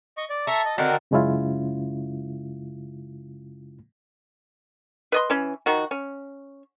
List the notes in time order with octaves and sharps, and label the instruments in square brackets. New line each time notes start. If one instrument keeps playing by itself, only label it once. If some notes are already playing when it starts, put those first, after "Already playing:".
[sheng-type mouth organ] D#5 C#6
D5
[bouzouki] A4 [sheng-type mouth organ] E5 A#5 C#6
[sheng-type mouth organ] D#5
[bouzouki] D3 D#3 C4 [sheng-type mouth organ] F#4 A#4
[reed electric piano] F#2 C#3 G#3 C#4 E4 F4
[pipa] B4 D#5 C6
E3 C#4
D#3 F3 F#4
C#4